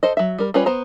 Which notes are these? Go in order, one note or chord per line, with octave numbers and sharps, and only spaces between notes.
A4 C5 D#5
F#3 E5
G3 A#4
G3 C#4 F4 B4 C#5
B3 C5 A#5